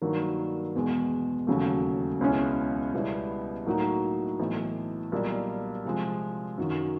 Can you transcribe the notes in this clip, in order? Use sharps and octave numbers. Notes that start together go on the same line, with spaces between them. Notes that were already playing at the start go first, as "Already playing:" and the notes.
G2 D#3 F#3 A#3
E2 B2 G#3
E1 D#2 C#3 F#3 A3
C#2 B2 G#3 C#4 E4
C#2 B2 G3 B3 E4
A2 F#3 A#3 D#4 F#4
B1 A2 E3
B1 A#2 G3 A#3
C3 F3 G#3
F#2 D#3 F#3